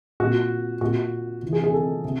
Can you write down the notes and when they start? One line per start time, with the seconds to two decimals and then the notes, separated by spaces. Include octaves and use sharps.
0.20 A#2 F#4
0.81 A#2 F#4
1.43 C3 E3
1.53 G#4
1.63 G#4
1.73 A4
2.04 C3